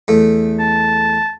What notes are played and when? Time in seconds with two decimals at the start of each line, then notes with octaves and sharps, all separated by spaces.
0.08 E2 A3
0.60 A5